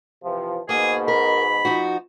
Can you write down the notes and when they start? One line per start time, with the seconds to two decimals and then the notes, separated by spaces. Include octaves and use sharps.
0.23 C3 E3 F3
0.69 G#2 B2 A#3 G#4
1.08 A#4 B5
1.65 F3 D#4 F#4